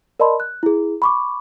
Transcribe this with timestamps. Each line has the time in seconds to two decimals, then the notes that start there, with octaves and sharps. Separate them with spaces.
0.20 A#4 D5 D#5 A5 B5 C6
0.40 F#6
0.63 E4 G#4
1.02 B5 C#6 D6